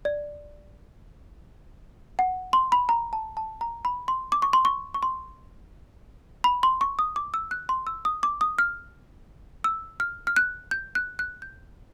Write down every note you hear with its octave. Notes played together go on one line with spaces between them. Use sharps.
D5
F#5
C6
B5
A#5
A5
A5
A#5
B5
C6
D6
C#6
C6
C#6
C#6
C6
B5
C6
C#6
D#6
D6
E6
F#6
C6
E6
D#6
D6
D#6
F6
E6
F6
F6
F#6
G6
F#6
F#6
G6